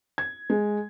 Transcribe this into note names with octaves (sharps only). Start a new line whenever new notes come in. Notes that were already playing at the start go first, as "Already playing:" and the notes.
G#6
G#3